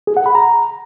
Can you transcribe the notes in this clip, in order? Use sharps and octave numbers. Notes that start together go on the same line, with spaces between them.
G#4
F#5
B5
A#5